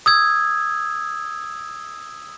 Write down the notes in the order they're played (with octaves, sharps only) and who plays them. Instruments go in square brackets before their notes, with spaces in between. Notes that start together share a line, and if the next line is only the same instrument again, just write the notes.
[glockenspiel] D#6 E6 G#6